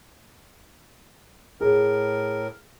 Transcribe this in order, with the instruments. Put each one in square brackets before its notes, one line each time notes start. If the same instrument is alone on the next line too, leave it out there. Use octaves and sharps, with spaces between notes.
[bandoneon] A2 A#4 [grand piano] G#4